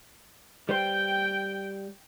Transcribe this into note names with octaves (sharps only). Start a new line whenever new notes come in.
G3 B4 C5 G5